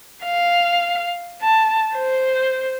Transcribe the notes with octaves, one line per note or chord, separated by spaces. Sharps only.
F5
A5
C5